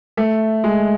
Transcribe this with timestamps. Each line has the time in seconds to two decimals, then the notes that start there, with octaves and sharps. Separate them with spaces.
0.17 A3
0.64 G#3